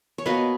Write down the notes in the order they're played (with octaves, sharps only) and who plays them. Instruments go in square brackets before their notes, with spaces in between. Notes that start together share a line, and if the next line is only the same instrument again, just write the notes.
[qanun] C#5
B2 A#3 B4 D#5